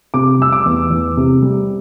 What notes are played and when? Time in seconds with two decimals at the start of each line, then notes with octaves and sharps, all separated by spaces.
0.14 C3 D6
0.39 G3 E6
0.52 D6
0.66 E2
0.90 E2
1.17 C3
1.42 G3